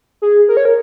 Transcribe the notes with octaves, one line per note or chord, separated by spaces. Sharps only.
G#4
A#4
C#5
A#4